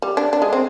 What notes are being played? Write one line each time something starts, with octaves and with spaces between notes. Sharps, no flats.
G3
D4
D4
G#3
C4